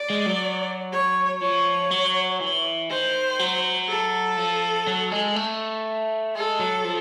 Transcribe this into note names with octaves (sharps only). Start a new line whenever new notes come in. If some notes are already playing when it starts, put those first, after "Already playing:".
Already playing: D5
G#3
F#3
C#5
F3 C#5
F#3
E3
D#3 C5
F#3
A4
F3
F#3
G#3
A3
G#3 A4
F#3
F3